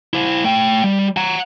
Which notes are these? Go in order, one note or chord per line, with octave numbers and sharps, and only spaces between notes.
E4 C5
A3 G5
G3
F#5 A#5